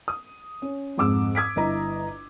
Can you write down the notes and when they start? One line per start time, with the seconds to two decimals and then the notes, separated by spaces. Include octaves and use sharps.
0.08 D#6
0.62 C#4
0.98 F2 G#2 D6 E6
1.35 D#6 G#6 B6 D7
1.56 G1 E4 D#5 A#5